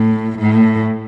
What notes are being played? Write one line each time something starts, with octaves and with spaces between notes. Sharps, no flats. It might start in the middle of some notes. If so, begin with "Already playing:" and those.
Already playing: A2
A2